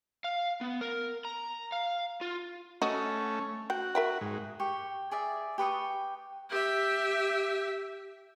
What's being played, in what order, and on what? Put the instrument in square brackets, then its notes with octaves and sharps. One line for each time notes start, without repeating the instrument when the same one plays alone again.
[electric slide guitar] F5
B3
A#4
A#5
F5
F4
[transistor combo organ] A3 C#4 [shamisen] F#4 D#5
[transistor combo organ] F#4 [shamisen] G5
[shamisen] A#4 E5 G5
[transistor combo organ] G#2
[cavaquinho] G4 C#6
G#4 D5 E5
G4 B4 C#6 D#6
[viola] G4 E5